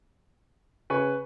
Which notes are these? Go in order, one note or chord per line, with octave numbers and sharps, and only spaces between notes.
C#3 B4 G#5 C#6